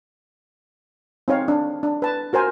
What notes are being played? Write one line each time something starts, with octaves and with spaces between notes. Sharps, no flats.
C4 D#4 C#5 F5
D4
D4
B4 A5
F#4 A#4 C5 G#5